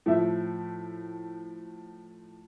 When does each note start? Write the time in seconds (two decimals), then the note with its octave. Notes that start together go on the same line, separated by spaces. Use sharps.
0.06 A2 F3 E5